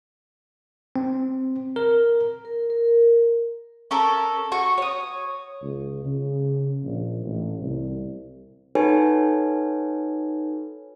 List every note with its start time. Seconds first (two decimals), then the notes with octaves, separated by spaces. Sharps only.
0.96 C4
1.76 A#4
2.45 A#4
2.70 A#4
3.91 C#4 A4 A#4
4.52 F#4 C#6
4.78 C#5 D#6
5.62 C#2
6.05 C#3
6.84 A#1
7.23 A1
7.61 C2
8.75 D#4 F#4 A4 B4 C#5 G#5